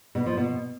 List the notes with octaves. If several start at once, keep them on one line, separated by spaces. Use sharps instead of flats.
B2
F3
B2